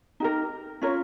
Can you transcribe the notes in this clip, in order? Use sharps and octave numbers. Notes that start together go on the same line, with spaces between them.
D#4 G4 A#4
C#4 F4 A#4 C#5